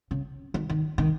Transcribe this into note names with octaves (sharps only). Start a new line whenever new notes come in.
C#3
D#3
D#3
D#3